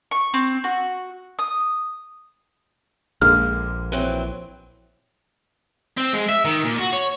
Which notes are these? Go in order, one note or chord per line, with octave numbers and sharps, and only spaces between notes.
C#6
C4
F#4
D#6
A#1 D3 G#3 A#3 F6
E3 F#3 C4
C4
G#3
E5
D#3
A#2
F#4
C#5